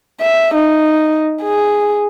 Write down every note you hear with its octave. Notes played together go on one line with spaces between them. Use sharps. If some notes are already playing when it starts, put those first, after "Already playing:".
E5
D#4
G#4